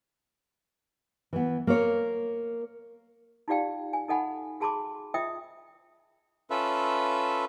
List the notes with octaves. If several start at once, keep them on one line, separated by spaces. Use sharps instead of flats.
E3 B3
A#3 C#5
D#4 F4 G4 D5 F5 G5
G#5
D#4 A4 D#5 F#5 G#5 B5
F#4 G#4 A5 B5 C6 D6
F4 D#5 E5 G5 D#6
C#4 F4 A4 B4 E5